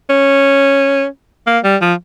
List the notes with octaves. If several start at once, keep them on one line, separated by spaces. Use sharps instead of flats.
C#4
A#3
G3
F3